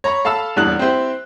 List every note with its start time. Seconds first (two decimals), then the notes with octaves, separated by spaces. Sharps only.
0.04 C#5 A#5 B5 C#6
0.25 A4 F5 A5 B5 E6
0.56 D#1 E2 G3 D4 F#6 F#7
0.79 C4 E4 G4 C5